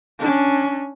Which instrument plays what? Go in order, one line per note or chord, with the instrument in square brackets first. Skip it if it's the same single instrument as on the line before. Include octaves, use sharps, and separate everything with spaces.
[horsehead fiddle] C#4 D4